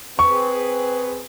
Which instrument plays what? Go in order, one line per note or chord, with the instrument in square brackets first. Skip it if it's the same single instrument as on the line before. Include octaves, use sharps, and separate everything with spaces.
[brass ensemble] C4 G#4 B4 [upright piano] C#6